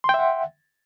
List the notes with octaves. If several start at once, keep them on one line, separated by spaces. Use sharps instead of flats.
E5 F#5 G5 C6